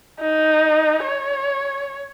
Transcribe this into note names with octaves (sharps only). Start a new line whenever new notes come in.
D#4
C#5